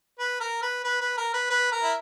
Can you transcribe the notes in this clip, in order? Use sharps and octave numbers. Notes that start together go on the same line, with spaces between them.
B4
A#4
B4
B4
B4
A#4
B4
B4
A#4
E4